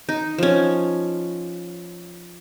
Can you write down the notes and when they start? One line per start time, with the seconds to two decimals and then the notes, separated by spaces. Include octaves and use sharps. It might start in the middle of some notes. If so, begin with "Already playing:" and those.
0.09 D#4
0.38 F3 C#4